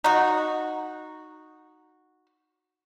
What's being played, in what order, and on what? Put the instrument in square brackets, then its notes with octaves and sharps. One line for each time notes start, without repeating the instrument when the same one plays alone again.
[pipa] D#4 F#4